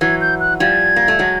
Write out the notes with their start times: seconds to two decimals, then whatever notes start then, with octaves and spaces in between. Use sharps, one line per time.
0.01 E3 F#3 G#6
0.21 G6
0.40 F#6
0.60 F3 G3 G#6
0.96 A#3
1.08 A3
1.19 F#3 G#3